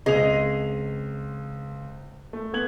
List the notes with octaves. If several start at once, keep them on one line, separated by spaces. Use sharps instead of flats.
C#2 C4 G#4 D#5 F7
A3
B3 G#6 F#7